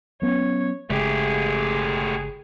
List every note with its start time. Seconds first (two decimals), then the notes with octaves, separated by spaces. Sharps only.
0.22 F#3 B3 C#4 C#5
0.90 G1 C#3 G#3 A3 G4 G#4